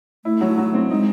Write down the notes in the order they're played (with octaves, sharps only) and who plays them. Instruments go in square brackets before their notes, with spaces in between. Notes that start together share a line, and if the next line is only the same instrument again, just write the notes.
[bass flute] A3 [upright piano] E4
[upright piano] F#3
F#3
C4
[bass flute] G#3 [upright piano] D#4